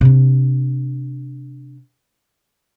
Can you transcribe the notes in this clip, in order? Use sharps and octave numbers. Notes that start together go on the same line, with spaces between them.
C3 D4